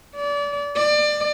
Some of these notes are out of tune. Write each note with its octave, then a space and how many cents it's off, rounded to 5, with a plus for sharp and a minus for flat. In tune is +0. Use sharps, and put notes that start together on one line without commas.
D5 -30
D5 +25